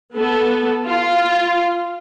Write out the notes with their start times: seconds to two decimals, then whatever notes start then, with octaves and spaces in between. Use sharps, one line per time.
0.15 B3 A4
0.85 F4